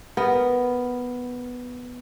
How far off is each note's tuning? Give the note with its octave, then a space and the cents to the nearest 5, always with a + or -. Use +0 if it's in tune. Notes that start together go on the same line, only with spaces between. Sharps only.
B3 +0 A#4 +0